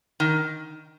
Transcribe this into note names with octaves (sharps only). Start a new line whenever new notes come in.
D#3